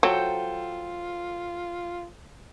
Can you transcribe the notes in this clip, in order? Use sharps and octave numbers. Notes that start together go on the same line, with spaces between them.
F#3 F4 A4 C5 G5